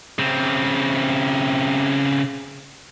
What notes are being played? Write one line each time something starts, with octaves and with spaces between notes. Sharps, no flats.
C#3 C4